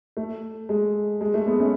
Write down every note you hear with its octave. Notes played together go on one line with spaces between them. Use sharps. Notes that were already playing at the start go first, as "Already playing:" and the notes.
A3
G#3
G#3
A3
G#3 B3
A3 C#4